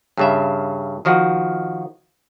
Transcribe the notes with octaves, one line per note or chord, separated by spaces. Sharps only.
G2 C#3 E5
D#3 F3 F#4